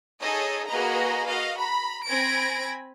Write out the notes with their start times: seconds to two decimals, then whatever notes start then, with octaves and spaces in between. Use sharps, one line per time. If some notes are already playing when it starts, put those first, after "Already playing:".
0.21 D#4 G#4 A4 C#5 D#5
0.67 A#3 F#4 G#4 B4 D#5 A#5
1.26 F#4 D#5 F5
1.59 A#5 B5
2.07 C4 G#5 B5 G#6 A#6 D7